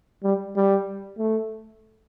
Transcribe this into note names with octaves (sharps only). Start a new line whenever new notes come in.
G3
G3
A3